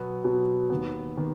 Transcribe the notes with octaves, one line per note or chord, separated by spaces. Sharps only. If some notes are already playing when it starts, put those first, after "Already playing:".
Already playing: B2 F#3 B3
B2 F#3 B3
D#2 D#3 B3
D#3 B3